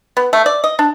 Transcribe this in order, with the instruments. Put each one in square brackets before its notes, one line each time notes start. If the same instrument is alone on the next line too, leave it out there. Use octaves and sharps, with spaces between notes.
[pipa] B3
A3
D5
D#5
D4